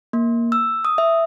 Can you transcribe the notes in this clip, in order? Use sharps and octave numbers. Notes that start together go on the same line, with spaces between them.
A#3
E6
D#6
E5